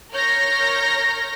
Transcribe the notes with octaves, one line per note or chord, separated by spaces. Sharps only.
A#4 C#5 F6 G6 A#6